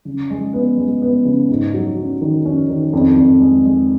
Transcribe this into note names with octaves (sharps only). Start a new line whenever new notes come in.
C#3
G#3
B3
G#3
B3
C#3
G#2
F#3
C#4
D#3
C#4
D#3
F2
F2
G#3
G#3